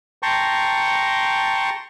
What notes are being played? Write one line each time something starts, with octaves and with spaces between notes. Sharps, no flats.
G5 A5 A#5 C6 C#6